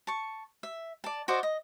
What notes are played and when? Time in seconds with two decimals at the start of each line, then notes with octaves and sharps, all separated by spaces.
0.07 A5 C#6
0.63 E5
1.04 D5 A5
1.28 F#4 C5 D5 D#5
1.43 D#5